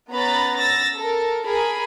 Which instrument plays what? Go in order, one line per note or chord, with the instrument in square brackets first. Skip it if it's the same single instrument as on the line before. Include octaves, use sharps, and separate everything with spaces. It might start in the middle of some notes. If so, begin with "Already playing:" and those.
[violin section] B3 C#4 A#5 B5 A6
E6 A6 A#6
A4 A#4
G#4 A#4 B5